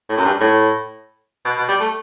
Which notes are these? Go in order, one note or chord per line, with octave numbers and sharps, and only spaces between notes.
A2
F#2
G2
A2
B2
B2
G3
A3